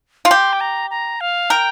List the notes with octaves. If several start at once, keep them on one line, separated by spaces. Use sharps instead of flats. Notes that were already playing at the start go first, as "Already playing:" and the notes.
F4
G4 C6
G5
A#5
A#5
F5
A#4 G5